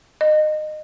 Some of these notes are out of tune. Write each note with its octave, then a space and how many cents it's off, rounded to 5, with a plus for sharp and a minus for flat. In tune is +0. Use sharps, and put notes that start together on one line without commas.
D#5 -20